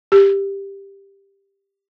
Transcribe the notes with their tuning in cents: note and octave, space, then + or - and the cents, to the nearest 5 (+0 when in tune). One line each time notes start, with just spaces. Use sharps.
G4 +10